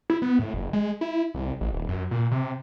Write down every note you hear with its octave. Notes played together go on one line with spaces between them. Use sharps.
E4
B3
A2
F#1
G#3
E4
C2
A1
D#1
F#2
A#2
C3